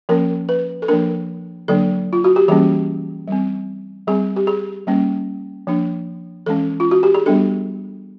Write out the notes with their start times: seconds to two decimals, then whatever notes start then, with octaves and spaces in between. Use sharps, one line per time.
0.09 F3 A#3 C#4 A#4
0.49 B4
0.82 A4
0.88 F3 A#3 D4 A#4
1.68 D3 F#3 A#3 D4 A4
2.13 F4
2.24 F#4
2.36 G4
2.48 E3 G3 A#3 C#4 G#4
3.28 G3 C4
4.07 G3 C4 G#4
4.36 G4
4.47 G#4
4.87 G3 A#3 C#4
5.67 F3 A#3 D4
6.46 E3 G#3 C#4 A4
6.80 F4
6.91 F#4
7.03 G4
7.14 G#4
7.26 G3 B3 D4 A4